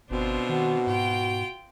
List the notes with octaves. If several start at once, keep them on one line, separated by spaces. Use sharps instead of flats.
G1 B2 C4 D4 F4
D#3 F#4
G#2 F4 G5